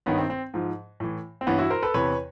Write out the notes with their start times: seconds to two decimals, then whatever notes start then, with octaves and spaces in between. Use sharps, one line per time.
0.06 G2 D#3 B3 C#4
0.18 C4
0.30 C4
0.54 G#2 F3
1.00 A2 E3
1.41 C4
1.47 G2 E3 B3 C#4
1.59 E4 F#4
1.70 A#4 C5
1.83 A4 B4
1.94 E2 C3 E3 B4 C#5